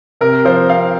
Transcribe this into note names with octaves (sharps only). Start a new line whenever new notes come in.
C3 A#4
F3 C5
C4 F5